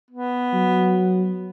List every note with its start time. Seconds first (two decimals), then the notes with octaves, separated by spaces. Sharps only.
0.11 B3
0.54 F#3